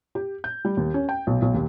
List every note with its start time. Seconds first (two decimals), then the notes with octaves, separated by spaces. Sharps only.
0.15 G4
0.44 G6
0.65 G3
0.77 D#2
0.94 C#4
1.09 G5
1.27 B1
1.42 B1
1.54 D#2